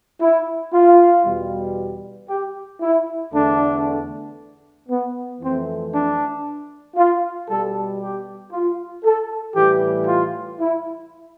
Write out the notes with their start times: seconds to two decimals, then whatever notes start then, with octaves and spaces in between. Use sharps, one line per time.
0.21 E4
0.73 F4
1.25 E2 B2 G3
2.28 G4
2.81 E4
3.33 E2 D3 A3 D4
4.89 B3
5.40 F2 E3 A3 C4
5.93 D4
6.95 F4
7.48 B2 G3 A4
8.00 G4
8.52 F4
9.03 A4
9.55 A2 E3 G3 G4
10.08 F4
10.59 E4